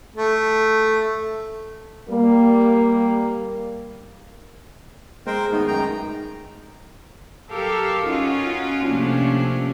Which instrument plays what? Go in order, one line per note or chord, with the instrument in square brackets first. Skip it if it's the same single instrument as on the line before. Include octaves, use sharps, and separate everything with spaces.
[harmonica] A3
[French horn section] G3 A#3
[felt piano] G#3 [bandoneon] A#4 C5 G5
[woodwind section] D#3 A3 D#4 [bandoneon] B3
[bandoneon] F#2 G5 A#5
[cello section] F#3 G4 A4 A#4 F5
C#4 D#4 F4 F#4
C3 F3 A3 A#3 C#4 D4